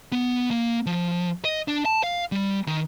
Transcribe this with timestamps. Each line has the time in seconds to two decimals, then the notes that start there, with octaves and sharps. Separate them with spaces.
0.12 B3
0.51 A#3
0.86 F3
1.45 D#5
1.68 D4
1.85 A5
2.03 F5
2.32 G3
2.67 D#3